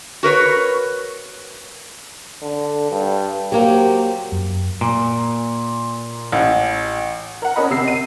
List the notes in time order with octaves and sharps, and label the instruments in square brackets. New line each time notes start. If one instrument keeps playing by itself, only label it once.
[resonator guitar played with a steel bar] F#4 A#4 B4 C#5
[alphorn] D3
G2
[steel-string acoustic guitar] F#3 A#3 C4 [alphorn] G4
[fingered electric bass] F#2
[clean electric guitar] A#2
[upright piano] A1
[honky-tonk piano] A#4 F#5
C#4 A#4 D#5 B5
C3 E6 C7
D#7